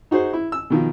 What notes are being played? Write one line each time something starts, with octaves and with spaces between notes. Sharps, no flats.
D#4 F#4 G#4 C5
E4
E6
B2 D#3 F3